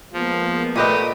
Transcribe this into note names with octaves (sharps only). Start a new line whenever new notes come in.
F3 G#3 A#3 B3
A#2 A3 G4 B4 D#5 D#6